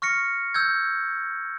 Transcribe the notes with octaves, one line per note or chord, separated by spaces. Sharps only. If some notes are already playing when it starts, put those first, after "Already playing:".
C#6 F6 A#6 C#7
E6 G6 G#6